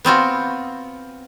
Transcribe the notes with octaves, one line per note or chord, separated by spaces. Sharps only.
B3 C4 F4 F#4